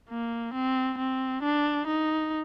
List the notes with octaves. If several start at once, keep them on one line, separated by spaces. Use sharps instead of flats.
A#3
C4
C4
D4
D#4